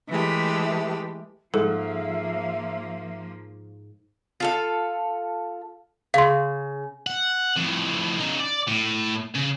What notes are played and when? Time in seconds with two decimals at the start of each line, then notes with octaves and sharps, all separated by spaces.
0.10 E3 G#3 A3 G4
1.54 G#2 F3 A#3 A4 E5
4.40 F4 A4 F5
6.14 C#3 F5 C6
7.07 F#5
7.57 F2 A2
8.20 C#3 D#4
8.40 D5
8.68 A2
9.35 C#3